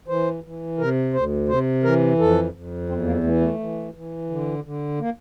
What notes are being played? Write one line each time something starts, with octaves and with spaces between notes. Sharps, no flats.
E3 C5
E3
C3 A#4
D2 C5
C3 C5
E3 A#4
F2 A4
F2
E2 C4
A#3
E3 A3
A3
E3
E3
D3
D3
A#3